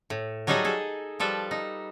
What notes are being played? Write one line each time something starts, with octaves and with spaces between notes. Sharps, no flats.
A2
F#3 G3 D#4 G#4 A4 D#5
G#4 A4
F3 G3 A4 B4
D#4